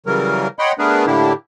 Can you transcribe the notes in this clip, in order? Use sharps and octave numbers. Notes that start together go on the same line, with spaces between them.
C#3 E3 F#3 G3 A#4
C#5 D#5 F#5 G5 B5 C6
A3 B3 D4 G#4 A#4 B4
A2 D3 A#3 D4 E4 G4